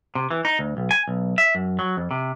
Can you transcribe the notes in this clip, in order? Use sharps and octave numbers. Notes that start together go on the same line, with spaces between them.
C3
E3
D#4
D2
B1
G#5
B1
E5
F#2
F#3
F2
C3